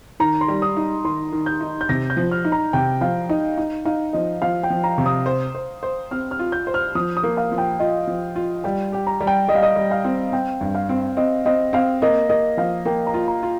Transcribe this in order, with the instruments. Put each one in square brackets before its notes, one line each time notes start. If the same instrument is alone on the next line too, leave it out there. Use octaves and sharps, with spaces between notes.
[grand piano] D#3 [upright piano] A#5
[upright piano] C6
[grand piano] G3
[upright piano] D#6
[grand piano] D#4
[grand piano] D#3 [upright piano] C6
[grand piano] D#3
[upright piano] G6
[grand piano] D#4
[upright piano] G6
[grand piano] C3 [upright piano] A#6
[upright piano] G6
[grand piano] F3
[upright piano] F6
[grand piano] D#4
[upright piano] A#5
[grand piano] C3 [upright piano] G5
[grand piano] F3 [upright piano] F5
[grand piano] D#4 [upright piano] D#5
[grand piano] D#4
[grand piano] D#4 [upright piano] F5
[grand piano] F3 [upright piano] D#5
[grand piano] F3 [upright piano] F5
[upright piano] G5
[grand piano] F3
[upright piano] A#5
[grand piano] C3
[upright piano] D#6
[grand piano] C5
C5
C5
[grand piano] C4 [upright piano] F6
[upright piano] F6
[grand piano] F4
[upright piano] G6
[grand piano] C5
[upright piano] F6
[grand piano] F3 [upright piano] D#6
[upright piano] D#6
[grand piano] A#3
[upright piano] F5
[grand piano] F3
[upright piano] G5
[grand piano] F4 [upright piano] D#5
[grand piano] F3
F4
[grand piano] G3 [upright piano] G5
[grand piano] G4 [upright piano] G5
[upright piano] A#5
[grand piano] G3
[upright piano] G5
[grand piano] G3 [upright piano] D#5
[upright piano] F5
D#5
[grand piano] G3
[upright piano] F5
[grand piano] C4
[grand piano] C4 [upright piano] G5
[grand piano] G2
[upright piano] F5
[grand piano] C4
[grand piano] C4 [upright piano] D#5
[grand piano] C4 [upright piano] D#5
[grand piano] C4 [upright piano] F5
[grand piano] A#3 [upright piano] D#5
[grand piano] A#3 [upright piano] D#5
[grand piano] F3 [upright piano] F5
[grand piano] A#3 [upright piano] G5
[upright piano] A#5
[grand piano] F4
[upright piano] A#5
[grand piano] F4